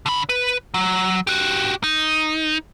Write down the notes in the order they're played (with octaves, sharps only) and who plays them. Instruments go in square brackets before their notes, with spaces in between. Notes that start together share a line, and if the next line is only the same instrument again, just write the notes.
[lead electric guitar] D3 B5
B4
F#3
F#4 G4
D#4